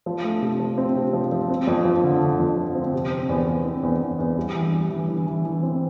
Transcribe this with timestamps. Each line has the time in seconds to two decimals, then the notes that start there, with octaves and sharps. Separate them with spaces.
0.06 F3
0.24 A3
0.42 C3
0.60 F3
0.78 C4
0.96 C3
1.13 F3
1.32 F3
1.50 C4
1.67 F2
1.85 F3
2.03 D3
2.21 D3
2.39 F2
2.57 F3
2.75 C4
2.93 C3
3.11 C4
3.29 E2
3.47 E2
3.65 C4
3.83 E2
4.01 E2
4.19 E2
4.37 G3
4.55 E3
4.73 G3
4.90 E3
5.09 E3
5.27 E3
5.45 E3
5.62 C4